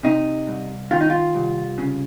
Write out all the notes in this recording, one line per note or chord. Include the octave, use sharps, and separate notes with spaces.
C3 D#4
C2
D#3 F4
D#4
F4
C2
C#3